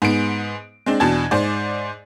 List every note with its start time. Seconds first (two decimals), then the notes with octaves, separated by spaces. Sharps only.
0.02 G#2 B3 D7
0.86 G#3 C4 D4
1.00 E2 B2 D4 A5 G#6
1.31 G#2 C5 D5